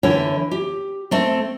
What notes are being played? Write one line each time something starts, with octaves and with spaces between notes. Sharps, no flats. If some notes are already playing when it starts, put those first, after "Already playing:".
D3 E3 C#5 E5
G4
A3 C4